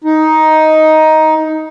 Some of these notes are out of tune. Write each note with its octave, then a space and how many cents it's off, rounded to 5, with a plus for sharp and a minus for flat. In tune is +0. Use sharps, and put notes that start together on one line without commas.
D#4 +10